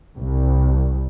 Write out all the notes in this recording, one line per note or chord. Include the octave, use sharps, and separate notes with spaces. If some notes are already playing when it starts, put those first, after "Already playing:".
C2